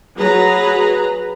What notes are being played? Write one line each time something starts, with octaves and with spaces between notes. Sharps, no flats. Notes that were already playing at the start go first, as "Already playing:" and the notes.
F#3 G#4 B4 A#5